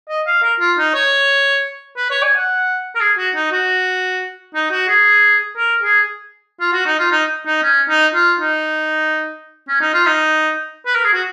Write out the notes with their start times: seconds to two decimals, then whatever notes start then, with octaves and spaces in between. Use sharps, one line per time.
0.09 D#5
0.27 F5
0.43 A#4
0.60 F4
0.78 D#4
0.94 C#5
1.97 B4
2.10 C#5
2.23 G#5
2.36 F#5
2.95 A#4
3.00 G#4
3.17 F#4
3.35 D#4
3.52 F#4
4.55 D#4
4.71 F#4
4.88 G#4
5.57 A#4
5.82 G#4
6.60 F4
6.73 F#4
6.86 D#4
6.99 F4
7.11 D#4
7.46 D#4
7.63 C#4
7.89 D#4
8.14 F4
8.40 D#4
9.68 C#4
9.81 D#4
9.94 F4
10.06 D#4
10.86 B4
10.95 A#4
11.04 G#4
11.13 F#4